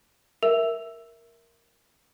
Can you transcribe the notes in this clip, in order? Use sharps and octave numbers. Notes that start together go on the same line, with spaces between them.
A#4 E5 E6 F7